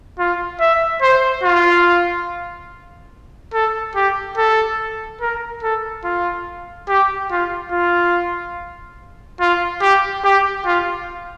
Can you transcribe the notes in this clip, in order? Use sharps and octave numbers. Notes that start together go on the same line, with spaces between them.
F4
E5
C5
F4
A4
G4
A4
A#4
A4
F4
G4
F4
F4
F4
G4
G4
F4